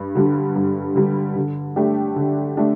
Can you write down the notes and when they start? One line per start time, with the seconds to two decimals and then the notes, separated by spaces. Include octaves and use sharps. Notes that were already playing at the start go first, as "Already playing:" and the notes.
Already playing: G2
0.15 D3 G3
0.56 G2
0.96 D3 G3
1.36 D3
1.76 A3 D4 G4
2.16 D3
2.57 A3 D4 G4